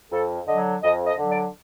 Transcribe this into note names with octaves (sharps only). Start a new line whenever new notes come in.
F2 A4
D3 F#3 D#5
F2 D#5
D#5
D3 F#3
D5